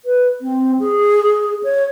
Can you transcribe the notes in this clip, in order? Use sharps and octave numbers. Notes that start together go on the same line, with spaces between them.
B4
C4
G#4
G#4
C#5